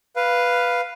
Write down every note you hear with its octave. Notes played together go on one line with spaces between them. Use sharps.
B4 F5